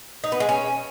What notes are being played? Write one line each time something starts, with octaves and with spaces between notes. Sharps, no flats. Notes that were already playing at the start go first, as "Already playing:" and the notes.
D#4
B3
G#3
C#4